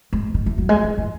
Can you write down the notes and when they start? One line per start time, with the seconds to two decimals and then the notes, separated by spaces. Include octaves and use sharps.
0.13 G#3
0.34 D#3
0.46 E3
0.58 F#3
0.69 G#3
0.84 E3
0.98 E3